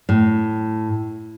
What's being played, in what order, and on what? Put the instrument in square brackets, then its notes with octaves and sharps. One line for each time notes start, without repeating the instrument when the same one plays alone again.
[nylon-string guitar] A2